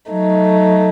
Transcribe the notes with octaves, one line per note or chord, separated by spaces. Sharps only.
F#3 A3 D#4